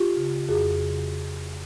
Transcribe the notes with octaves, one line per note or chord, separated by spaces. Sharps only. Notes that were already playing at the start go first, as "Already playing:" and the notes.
Already playing: F4 G4
C#3
F2 F#4 G#4
C#3